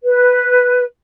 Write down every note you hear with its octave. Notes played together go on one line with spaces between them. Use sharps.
B4